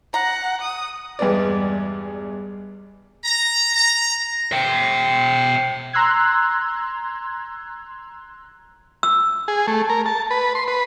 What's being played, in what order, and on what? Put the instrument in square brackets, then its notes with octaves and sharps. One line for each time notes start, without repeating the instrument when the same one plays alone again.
[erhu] F#5 [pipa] A#5
[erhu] D#6
[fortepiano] E2 G2 G#3 B3 D5
[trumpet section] A#5
A#5
[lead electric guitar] E5 G5
[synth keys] A#5 C6 E6 F#6 G#6
[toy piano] E6
[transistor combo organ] G#4
A3
A#4
A5
B4
C6
B4